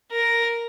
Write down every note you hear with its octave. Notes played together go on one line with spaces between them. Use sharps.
A#4